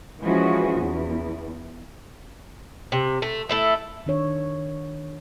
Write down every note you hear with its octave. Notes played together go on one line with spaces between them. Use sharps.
E3 F3 G#3 C#4 F#4 G#4
E2
C3
A3
A3 E4 A4
D#3 D4 C#5